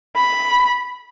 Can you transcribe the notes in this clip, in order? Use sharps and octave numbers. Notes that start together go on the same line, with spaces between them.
B5